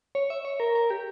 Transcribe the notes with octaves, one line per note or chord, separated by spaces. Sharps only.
C#5
E5
C#5
A#4
A#4
G4